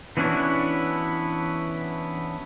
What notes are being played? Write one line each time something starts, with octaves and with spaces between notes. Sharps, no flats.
E3 B3 C#4 D4 E4 F#4